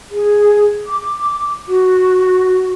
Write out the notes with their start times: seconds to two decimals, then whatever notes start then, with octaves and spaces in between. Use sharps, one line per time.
0.11 G#4
0.87 D6
1.68 F#4